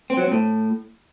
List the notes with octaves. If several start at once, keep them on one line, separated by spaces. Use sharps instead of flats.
C4
F#3
C4
A2